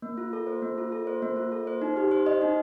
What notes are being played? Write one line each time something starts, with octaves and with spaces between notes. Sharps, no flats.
A#3
F4
A4
C5
A#3
F4
A4
C5
A#3
F4
A4
C5
D#4
G4
C5
D#5
D#4